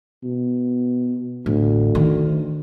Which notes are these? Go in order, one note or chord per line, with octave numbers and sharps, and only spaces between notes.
B2
A1 D2
D#3